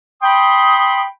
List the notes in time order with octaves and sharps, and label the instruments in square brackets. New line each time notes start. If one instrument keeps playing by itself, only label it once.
[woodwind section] G5 B5 C6 D#6